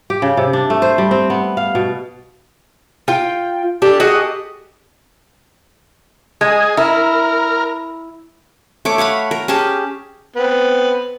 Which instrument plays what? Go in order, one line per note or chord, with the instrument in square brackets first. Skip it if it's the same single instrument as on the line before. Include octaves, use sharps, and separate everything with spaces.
[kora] G4
C#3
C3
D4
A3
C5
G3
C4
B3
F5
B2
[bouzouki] F4 [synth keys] G5
[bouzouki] D4 [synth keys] G4 A4
[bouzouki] F#4 G#4 D#5
[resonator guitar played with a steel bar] G#3 [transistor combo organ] G#4
[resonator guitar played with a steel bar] E4 [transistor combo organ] A#4
[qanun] A3 C#5 D6
C#5 F5 F#5 B5
A#4
C#4 G4 G#4 A5
[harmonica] B3 C4